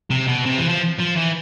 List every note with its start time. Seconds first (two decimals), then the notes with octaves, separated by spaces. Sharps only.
0.10 C3
0.28 B2
0.46 C3
0.58 E3
0.69 F3
1.00 F3
1.17 E3